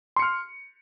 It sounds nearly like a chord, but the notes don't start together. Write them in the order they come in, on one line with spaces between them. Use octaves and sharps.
C6 C#7 F6